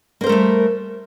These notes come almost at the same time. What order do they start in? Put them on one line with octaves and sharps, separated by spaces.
A#3 C5 A#4 A3 G3